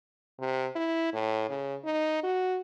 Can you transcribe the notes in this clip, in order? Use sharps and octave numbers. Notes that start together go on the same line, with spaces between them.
C3
E4
A2
C#3
D#4
F#4